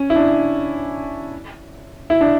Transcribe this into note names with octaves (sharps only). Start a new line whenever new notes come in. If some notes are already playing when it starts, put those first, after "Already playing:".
Already playing: C#4
E4
D4
E4
D4